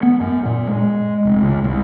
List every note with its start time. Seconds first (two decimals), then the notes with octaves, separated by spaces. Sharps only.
0.03 B3
0.21 F#2
0.45 A#2
0.67 G#3
1.25 F1
1.42 C#2
1.64 C2